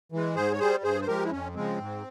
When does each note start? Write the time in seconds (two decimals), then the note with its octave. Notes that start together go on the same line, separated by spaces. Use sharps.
0.12 E3 G#3
0.35 G#2 G#4 C5
0.52 C#5
0.59 G3 G#4 C5
0.83 G2 G#4 C5
1.02 C5
1.07 F3 G#3 G4 A#4
1.24 E4
1.31 F2 C#4
1.55 C#3 F3 G#3 C4
1.79 G#2